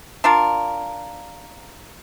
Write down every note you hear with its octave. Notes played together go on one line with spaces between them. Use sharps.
D4 F4 A#4